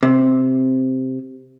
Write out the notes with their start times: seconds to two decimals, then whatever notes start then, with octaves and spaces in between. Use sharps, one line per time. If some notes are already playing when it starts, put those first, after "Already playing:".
0.03 C3